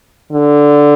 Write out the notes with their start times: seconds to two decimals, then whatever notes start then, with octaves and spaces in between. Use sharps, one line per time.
0.33 D3